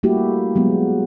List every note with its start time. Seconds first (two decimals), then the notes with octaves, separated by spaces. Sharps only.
0.03 G3 A3 A#3 E4 F#4 G4
0.56 F#3 G#3 B3